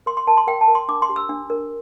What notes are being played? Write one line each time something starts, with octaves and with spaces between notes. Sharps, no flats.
A#4 C6
C6
A#4 A5
C6
A#4 G5
A5
A#4
C6
D4 D6
C6
G4
E6
D4
A#4